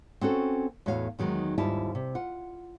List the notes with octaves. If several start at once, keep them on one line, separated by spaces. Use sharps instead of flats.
C4 C#4 F#4 A4
E2 A2 F#4 C#5 F5
E2 D#3 F#3 G#3 D#4
D#2 G#2 G3 E4 F4 A5
C3
F4 F#5